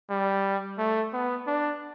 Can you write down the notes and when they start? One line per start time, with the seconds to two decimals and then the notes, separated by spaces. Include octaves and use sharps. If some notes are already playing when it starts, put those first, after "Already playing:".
0.10 G3
0.78 A3
1.13 B3
1.47 D4